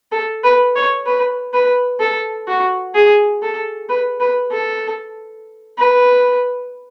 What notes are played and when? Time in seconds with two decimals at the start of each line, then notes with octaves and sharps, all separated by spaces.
0.12 A4
0.44 B4
0.75 C#5
1.06 B4
1.53 B4
2.00 A4
2.48 F#4
2.94 G#4
3.42 A4
3.89 B4
4.20 B4
4.51 A4
5.78 B4